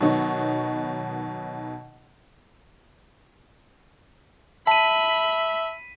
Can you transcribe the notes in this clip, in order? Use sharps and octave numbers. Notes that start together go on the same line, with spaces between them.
B2 D#3 F#3 B3 D#4 C#6
E5 A5 B5 B6 D#7